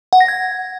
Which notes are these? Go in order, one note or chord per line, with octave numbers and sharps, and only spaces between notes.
F#5
A#6
G#6